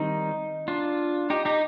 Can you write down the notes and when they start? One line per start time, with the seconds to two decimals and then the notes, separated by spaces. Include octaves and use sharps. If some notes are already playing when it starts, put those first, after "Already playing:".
Already playing: D#3 G3 C4 D#4
0.68 D4 F4
1.30 D#4 G4
1.45 D#4 G4